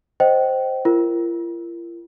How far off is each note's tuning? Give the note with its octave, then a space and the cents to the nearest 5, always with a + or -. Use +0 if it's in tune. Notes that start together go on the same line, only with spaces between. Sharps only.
C5 +0 D#5 -5 G5 -30
F4 -45 A#4 +0